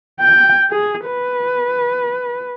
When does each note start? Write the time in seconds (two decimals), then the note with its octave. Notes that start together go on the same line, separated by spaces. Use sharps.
0.21 G5
0.71 G#4
1.06 B4